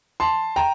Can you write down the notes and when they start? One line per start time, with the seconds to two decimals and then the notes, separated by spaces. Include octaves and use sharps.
0.20 A5 C6
0.56 G5 A#5